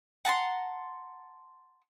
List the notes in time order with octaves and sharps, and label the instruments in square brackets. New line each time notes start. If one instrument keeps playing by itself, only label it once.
[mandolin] F#5 A5 A#5 C6